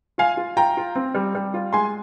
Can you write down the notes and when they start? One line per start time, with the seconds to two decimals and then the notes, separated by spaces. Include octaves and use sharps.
0.18 F4 F5 G#5
0.37 F4
0.57 F4 G5 A#5
0.77 F4
0.95 C4
1.15 G3
1.35 G3
1.54 F4
1.73 G#3 G#5 C6